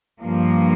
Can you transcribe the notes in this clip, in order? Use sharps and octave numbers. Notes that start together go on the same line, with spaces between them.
G2 F3 A#3